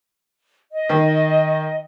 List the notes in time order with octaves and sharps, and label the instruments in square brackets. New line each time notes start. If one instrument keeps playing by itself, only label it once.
[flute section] D#5
[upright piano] D#3